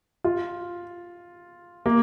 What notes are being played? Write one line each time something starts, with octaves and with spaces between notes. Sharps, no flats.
F4
A#3